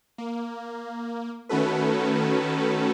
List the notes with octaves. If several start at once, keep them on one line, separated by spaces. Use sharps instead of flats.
A#3
D#3 A3 C#4 F#4 A4 B4